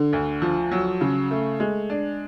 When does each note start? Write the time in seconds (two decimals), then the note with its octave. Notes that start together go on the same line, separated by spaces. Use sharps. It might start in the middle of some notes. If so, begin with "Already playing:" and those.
Already playing: D3
0.13 D2
0.42 F3
0.71 F#3
1.01 C#3
1.31 A3
1.60 G#3
1.90 D4